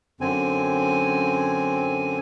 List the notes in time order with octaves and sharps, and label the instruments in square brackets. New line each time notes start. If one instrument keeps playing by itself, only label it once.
[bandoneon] F#2 D3 C4 G#5